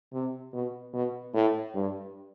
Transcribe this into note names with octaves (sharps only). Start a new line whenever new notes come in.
C3
B2
B2
A2
G2